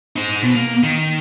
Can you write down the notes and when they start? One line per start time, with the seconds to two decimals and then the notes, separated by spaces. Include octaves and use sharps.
0.16 D#4 C5
0.43 B2
0.56 A#3
0.83 D#3